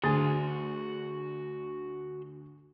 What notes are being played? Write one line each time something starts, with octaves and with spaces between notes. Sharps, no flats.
D2 D3 F#4 G#4 G#5 C6 D#6 A6